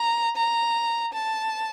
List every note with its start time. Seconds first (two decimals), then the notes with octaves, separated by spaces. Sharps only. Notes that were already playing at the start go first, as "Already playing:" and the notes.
Already playing: A#5
0.37 A#5
1.13 A5